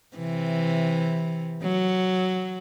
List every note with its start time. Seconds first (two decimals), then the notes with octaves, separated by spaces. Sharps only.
0.16 C3 E3
1.63 F#3